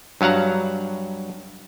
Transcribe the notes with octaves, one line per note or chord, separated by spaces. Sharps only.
G2 F#3 F5 F#5 A#5